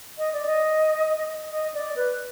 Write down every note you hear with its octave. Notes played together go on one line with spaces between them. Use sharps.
D#5
D5
D#5
D#5
D5
B4